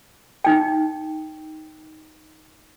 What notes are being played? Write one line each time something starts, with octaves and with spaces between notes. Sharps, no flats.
D#4 G5